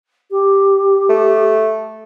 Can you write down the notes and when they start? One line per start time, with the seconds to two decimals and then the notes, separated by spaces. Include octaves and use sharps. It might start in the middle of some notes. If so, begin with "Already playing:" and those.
0.30 G4
1.09 A3